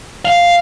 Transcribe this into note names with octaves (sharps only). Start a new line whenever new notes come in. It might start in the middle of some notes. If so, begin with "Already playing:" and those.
F5